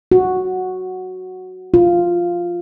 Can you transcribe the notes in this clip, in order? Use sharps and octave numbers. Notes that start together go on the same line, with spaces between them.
F#4
F4